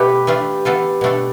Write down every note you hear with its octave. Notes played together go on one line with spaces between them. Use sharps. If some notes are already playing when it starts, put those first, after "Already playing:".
Already playing: B2 A3 E4 G4 A4 B4
E3 A3 D4 F4
E3 B3 F4 A4
B2 A3 D4 A4